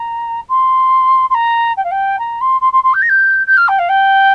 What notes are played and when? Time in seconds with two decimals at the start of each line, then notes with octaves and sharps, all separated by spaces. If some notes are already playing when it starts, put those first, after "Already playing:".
Already playing: A#5
0.49 C6
1.30 C6
1.34 A#5
1.77 G5
1.84 F5
1.91 G5
2.19 A#5
2.41 C6
2.61 C6
2.73 C6
2.84 C6
2.94 G6
3.02 A#6
3.09 G6
3.47 G6
3.57 F6
3.68 G5
3.79 F5
3.89 G5